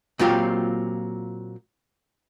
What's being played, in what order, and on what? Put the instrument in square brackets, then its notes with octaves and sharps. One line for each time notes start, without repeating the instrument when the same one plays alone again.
[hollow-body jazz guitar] A#2 F#3 C4 F4 G4